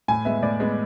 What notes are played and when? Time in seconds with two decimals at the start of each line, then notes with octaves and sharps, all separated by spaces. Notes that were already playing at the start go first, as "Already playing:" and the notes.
0.08 A2 G#5
0.25 G#3 B3 E5
0.42 A2 D5
0.60 G#3 B3